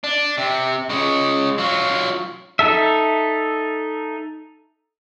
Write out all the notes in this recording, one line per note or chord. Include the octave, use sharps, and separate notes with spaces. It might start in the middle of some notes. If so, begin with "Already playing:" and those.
D4
C3
C#3 G#3
F#3 F4
D#4 A4 E5